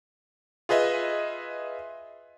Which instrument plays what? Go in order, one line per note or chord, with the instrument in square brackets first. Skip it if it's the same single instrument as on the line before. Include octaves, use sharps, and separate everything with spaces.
[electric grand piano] F4 G#4 B4 D#5 E5